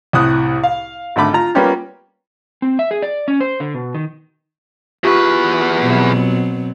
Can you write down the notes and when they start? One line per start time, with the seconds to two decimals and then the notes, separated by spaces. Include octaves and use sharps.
0.13 C2 A2 D#6 F#6
0.63 F5
1.16 G#1 D3 A3 B5 D6
1.33 F4 A#5
1.55 G3 A#3 B3 C#4 F4 G4
2.62 C4
2.79 E5
2.91 G#4
3.02 D5
3.28 C#4
3.41 C5
3.60 D3
3.74 B2
3.95 D#3
5.04 E2 F4 G4 B4 C#6
5.83 B2 F#3 C4